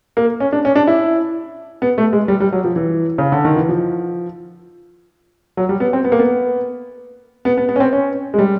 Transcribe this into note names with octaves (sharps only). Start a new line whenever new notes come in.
A#3
C#4
D4
C#4
D4
E4
B3
A3
G#3
G3
G3
F#3
F3
E3
C#3
D3
D#3
E3
F3
F#3
G3
B3
C4
B3
A#3
B3
B3
B3
B3
C#4
C4
C#4
G#3
G3